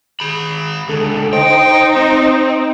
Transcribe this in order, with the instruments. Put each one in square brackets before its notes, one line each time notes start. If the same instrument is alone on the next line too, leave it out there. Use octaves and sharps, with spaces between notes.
[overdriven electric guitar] G#4 B5
[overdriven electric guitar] C#2 D3 [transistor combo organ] A4
[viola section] D#4 [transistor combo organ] C5 D#5 [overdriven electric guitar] G5
[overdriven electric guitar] C4